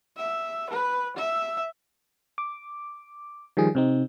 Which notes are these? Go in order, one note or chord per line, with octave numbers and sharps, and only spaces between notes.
E5
B4
E5
D6
D#3 F3 G3 G#4
C3 C4 D#4